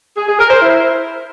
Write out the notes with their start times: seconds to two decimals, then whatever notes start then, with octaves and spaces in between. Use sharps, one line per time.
0.16 G#4
0.27 G#4
0.38 A#4
0.49 C5
0.60 E4